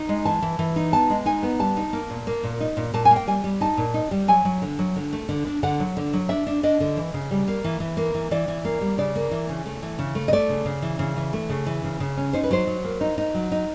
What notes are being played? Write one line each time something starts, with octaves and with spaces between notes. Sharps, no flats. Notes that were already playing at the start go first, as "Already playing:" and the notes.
Already playing: D#4
G#3
E3 A5
E3
E3
D#4
B3 A5
G#3
D#4 G#5
B3
G3 A5
D#4
A#3
A#2
A#3
A#2
D#4
A#2
A#2 A5
G#5
A#3
G5
G3 G#5
G3
D#4 A5
A#2
D#4
G3
F#3 G#5
F#3
D3
F#3
D3
A3
D3
D4
D3 F#5
F#3
D3
F#3
D4 E5
D4
D4 D#5
D3
E3
C#3
G3
A#3
E3
E3
A#3
E3
E3 D5
E3
A#3
G3
C#3 D5
A#3
E3
C#3
A3
E3
C#3
A3
D#5
A3 D5
C#3
C#3
E3
C#3
E3
A3
C#3
E3
C#3
C#3
C#4
D#4 C5
B4
F#3 C5
F#3
A#3
D#4
D#4
F#3
D#4